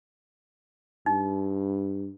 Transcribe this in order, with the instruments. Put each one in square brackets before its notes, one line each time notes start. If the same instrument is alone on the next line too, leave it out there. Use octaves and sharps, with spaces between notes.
[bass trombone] G2 [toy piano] D#4